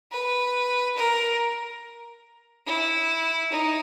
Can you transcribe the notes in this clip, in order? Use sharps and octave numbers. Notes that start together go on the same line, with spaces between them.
B4
A#4
E4
D#4